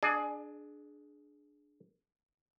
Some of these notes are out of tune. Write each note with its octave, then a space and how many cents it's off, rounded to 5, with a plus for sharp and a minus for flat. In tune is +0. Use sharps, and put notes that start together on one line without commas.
D4 +0 G#4 +20 D5 +40